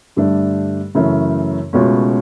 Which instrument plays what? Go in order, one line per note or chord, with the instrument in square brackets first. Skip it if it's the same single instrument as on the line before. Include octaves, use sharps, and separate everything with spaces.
[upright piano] G2 D3 A3 D4
F#2 C#3 E3 A3 C#4
C#2 B2 A3 C#4